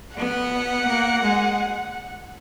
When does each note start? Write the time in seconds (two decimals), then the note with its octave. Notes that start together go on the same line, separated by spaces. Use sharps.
0.17 B3 F#5
0.87 A#3
1.22 G#3